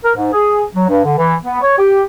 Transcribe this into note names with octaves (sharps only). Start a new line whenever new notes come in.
A#4
G#2
G#4
F#3
G2
D3
E3
B3
C#5
G4